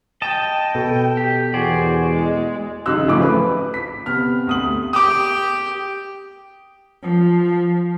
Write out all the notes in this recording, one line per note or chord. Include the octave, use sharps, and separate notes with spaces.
D#5 G5 A5
B2 A4
G4
E2 F#4 G#4 C5 D5
G#3
A1 C#3 F#3 D#4 E6 F#6
A1 C#3 F3 A3 D6
B4
B6
C3 B3 F6
D2 D#6 F#7
G4 G5 D6 D#6
F3